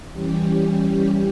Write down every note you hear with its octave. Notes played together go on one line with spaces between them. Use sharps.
E3 G3 C#4 G4